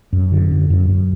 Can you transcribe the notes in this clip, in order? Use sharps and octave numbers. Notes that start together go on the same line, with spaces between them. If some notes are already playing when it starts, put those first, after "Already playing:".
F#2
D3
F#2
F#2
F#2